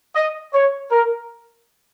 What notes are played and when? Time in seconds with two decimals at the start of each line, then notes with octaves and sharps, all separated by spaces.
0.15 D#5
0.54 C#5
0.91 A#4